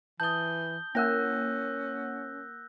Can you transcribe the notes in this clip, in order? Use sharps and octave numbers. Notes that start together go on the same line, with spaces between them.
E3 A5 D#6 G6 G7
A#3 C#4 A#4 F#5 E6 F#6 A#6